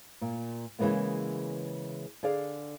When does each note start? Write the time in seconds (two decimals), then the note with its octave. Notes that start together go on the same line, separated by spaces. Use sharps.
0.21 A#2
0.79 C#3 E3 G#3 A#3 B3
2.23 D3 G#4 D5 F5